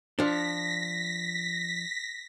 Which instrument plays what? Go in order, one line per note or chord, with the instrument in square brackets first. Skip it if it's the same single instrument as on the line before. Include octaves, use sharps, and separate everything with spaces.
[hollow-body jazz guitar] F3 D4 [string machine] A#6 B6